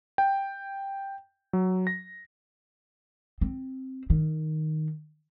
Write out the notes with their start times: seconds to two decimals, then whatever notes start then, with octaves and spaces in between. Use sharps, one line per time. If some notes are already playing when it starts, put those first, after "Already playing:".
0.18 G5
1.53 F#3
1.87 A#6
3.41 C4
4.10 D#3